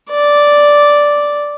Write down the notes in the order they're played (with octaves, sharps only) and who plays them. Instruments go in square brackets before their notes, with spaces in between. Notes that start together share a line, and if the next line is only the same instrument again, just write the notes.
[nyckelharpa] D5